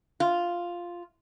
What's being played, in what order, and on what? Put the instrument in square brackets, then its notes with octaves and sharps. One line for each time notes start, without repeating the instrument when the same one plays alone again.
[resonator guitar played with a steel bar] F4